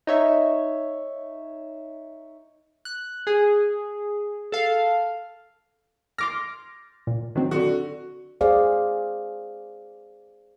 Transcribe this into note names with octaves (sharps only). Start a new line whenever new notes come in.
D#4 C#5 E5
F#6
G#4
A4 F5
C6 D6 F6 A#6
A#2
D#3 F#3 C4
D3 F#4
G#4 C5 D5 F5